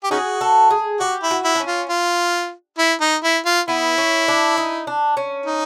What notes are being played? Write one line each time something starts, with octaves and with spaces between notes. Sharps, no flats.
G4
C#4 D#4 F#4 G#4
A4
G#4
F#4 G4
E4
F#4
E4
D4
C#4
F4
F4
E4
D#4
E4
F4
B3 E4
C#4
D4
D#4
D4
C#4
D#4